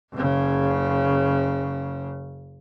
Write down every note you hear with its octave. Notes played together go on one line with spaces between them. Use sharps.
F#1 C#3